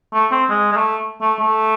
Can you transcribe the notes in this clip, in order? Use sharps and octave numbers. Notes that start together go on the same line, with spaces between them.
A3
C4
G#3
G#3
A3
A3
A3